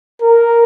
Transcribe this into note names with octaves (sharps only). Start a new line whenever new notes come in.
A#4